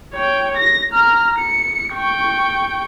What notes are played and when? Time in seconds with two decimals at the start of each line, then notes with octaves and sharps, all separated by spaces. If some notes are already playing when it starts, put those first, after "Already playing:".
0.13 C#5 G5
0.57 A#6
0.91 A#5 F6
1.39 C#7
1.94 G5 C#6